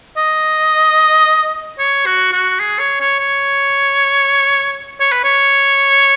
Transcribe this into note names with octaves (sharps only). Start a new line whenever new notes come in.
D#5
C#5
F#4
F#4
G#4
C#5
C#5
C#5
C#5
B4
C#5